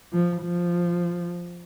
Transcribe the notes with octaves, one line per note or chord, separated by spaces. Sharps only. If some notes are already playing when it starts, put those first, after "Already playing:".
F3
F3